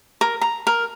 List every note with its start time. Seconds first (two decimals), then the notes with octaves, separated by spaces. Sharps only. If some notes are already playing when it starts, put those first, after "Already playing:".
0.21 A#4
0.41 A#5
0.67 A#4